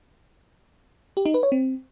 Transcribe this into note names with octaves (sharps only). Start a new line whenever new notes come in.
G4
D#4
B4
C#5
C4